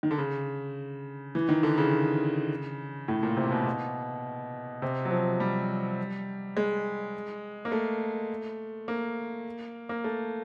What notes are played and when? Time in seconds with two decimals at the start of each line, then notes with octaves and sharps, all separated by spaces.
0.03 D#3
0.11 D3
0.18 C#3
1.35 E3
1.49 D#3
1.63 D3
1.78 C#3
3.08 A2
3.23 A#2
3.37 C3
3.52 B2
3.66 B2
4.82 C3
5.05 F#3
5.11 F3
5.40 G3
6.57 G#3
7.65 A#3
7.72 A3
8.88 A#3
9.89 A#3
10.04 A3